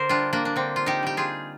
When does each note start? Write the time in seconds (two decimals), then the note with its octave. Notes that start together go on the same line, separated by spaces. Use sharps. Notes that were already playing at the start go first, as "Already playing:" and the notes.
Already playing: D3 A#4 C5 D5
0.09 G3 D4 F4
0.33 A#3 D4
0.45 D4
0.56 D3 C4
0.76 F4
0.86 D#4 G4
1.03 G3 G4
1.17 F4 G#4